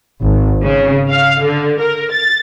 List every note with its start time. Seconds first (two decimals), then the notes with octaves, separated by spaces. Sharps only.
0.24 G#1
0.62 C#3
1.10 F5
1.44 D3
1.80 A#4
2.11 A6